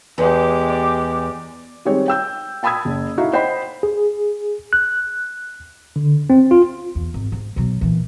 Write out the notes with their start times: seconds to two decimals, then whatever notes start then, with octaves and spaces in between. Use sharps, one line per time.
0.18 E2 G#3 G4
0.69 D5
1.85 D#3 G3 G#3 C4 C#5
2.08 G5 E6 G6
2.63 G5 A5 B5 D#6 E6 G#6
2.85 F#1
3.18 D#4 E4 F#4 A4 E5 F5
3.33 C5 D#5 F#5 G5 B5
3.83 G#4
4.73 F#6
5.96 D3
6.30 C4
6.51 F4
6.95 E2
7.14 G#1
7.32 G#2
7.56 B2 F#3
7.81 A#2 E3